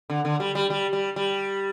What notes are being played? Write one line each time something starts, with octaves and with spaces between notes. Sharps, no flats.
D3
D3
G3
G3
G3
G3
G3